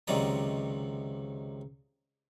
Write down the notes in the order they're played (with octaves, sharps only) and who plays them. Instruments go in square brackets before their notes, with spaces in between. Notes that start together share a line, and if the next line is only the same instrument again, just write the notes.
[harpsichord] C#2 C3 D#3 F#3 D5 A#5